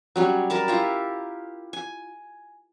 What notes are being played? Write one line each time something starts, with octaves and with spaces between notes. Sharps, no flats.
F#3 G3 C#4
A#4 A5 B5
E4 F4 G4
G#5